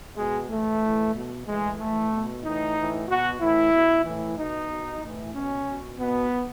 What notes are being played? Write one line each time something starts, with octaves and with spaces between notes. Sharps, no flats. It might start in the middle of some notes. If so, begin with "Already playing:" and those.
B2 G#3
A2 E3 A3
A2 E3
B2
A2 E3 G#3
A2 E3 A3
B2
A2 E3 D#4
A2 E3
B2 F#4
A2 E3 E4
B2
A2 E3
B2 D#4
B2
A2 E3
B2 C#4
B2
B2 B3